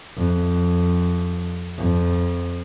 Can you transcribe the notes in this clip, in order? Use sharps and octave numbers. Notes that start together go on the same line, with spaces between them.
F2
F2